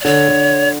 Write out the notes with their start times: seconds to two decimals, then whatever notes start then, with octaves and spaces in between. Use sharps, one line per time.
0.01 D5
0.05 D3 C#5
0.28 D3